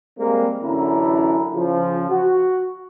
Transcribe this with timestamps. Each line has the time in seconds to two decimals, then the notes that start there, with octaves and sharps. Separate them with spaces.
0.19 G3 G#3 A#3 C4
0.63 A1 F#2 D3 C#4 E4 A#5
1.53 C#3 F3
2.10 F#4